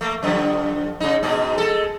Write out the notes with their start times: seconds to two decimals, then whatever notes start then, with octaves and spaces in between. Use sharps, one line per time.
0.01 A3 A#3
0.23 F#2 D3 F3
1.00 C#3 G#3 D#4
1.23 G#2 B2 G#4
1.58 G#3 A4